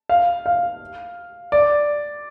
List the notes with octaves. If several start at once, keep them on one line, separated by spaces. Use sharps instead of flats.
F5
F5
D5